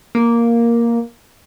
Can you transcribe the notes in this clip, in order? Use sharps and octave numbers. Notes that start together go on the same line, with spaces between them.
A#3